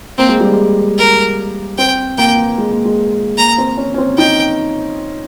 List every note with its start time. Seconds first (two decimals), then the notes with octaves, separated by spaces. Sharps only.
0.18 A#3 C4
0.29 G#3
0.40 G3
0.51 G#3
0.98 A#4
1.78 C4 G5
2.18 A#3 G5
2.58 G#3
2.72 A#3
2.85 G#3
3.38 A#3 A#5
3.58 C4
3.78 C#4
3.94 C#4
3.98 C4
4.18 D#4 G5